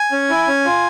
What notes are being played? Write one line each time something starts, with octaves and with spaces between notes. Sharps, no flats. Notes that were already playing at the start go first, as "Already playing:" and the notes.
Already playing: G#5
C#4
E4
C#4
F4